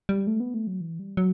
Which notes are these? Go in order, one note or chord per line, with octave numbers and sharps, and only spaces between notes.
G3
A3
B3
A3
F#3
E3
G3
F#3